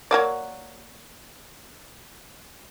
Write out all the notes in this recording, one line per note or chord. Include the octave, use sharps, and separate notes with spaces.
F#3 A#3 D5